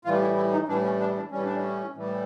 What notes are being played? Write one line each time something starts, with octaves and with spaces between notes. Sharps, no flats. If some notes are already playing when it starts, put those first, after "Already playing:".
A2 E3 G3 F4
E4
E4
D#4
A2 E3 G3 D4
C#4
D4
D4
A2 E3 G3 C#4
D4
C#4
A2 E3 G3